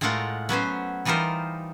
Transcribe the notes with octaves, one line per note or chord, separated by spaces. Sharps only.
A2 G#3 A3 F4 A#4 F#5
F#3 B3 C#4 C5
E3 G3 D#4 F4 A#4 C5